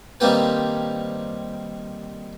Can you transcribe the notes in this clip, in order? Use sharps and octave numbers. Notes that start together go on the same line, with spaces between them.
D#3 G3 A#3 C4 G4 B4